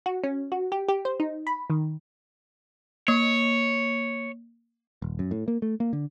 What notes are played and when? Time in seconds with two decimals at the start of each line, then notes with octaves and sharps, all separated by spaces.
0.06 F#4
0.24 C#4
0.52 F#4
0.72 G4
0.89 G4
1.05 C5
1.20 D#4
1.47 B5
1.70 D#3
3.08 A#3 C#5
5.02 D#1
5.19 F#2
5.31 A2
5.48 A#3
5.62 A3
5.80 A#3
5.93 D3